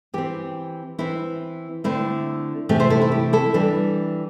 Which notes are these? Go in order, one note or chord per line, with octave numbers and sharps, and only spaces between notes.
E3 C4 G4
E3 C4 E4
D3 A3 C4 E4
C3 E3 A3 C4 G4
G4 C5
E4 A4
E4
G4
E4 A4
E3 G3 D4 G4